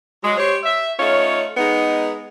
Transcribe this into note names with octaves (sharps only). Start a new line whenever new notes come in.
F#3 G#3
G4 C5 C#5
E5
A3 C#4 D#4 F4 C#5
G#3 B3 D#4